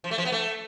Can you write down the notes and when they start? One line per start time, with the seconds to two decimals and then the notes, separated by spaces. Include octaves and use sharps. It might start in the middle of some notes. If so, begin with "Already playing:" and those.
0.04 F3
0.11 A3
0.18 F3
0.25 B3
0.32 A3